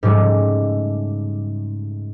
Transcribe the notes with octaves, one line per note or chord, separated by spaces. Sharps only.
G#2 C#3 G3 A3